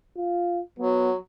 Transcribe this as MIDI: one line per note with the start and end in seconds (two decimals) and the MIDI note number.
0.17 0.61 65
0.79 1.15 54
0.79 1.10 59